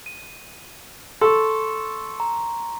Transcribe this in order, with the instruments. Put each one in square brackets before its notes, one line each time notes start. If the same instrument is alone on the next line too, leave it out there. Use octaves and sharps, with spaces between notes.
[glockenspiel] D#7
[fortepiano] A4 [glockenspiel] C6 C#6
[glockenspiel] A#5